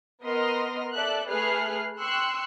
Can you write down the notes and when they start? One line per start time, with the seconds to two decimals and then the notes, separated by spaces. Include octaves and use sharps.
0.24 B3 A#4 D#5 C6 D#6 F6
0.93 A4 D5 E5 F#6
1.30 A3 G#4 B4 F6 F#6 C7
2.00 G5 C6 C#6 E6 F#6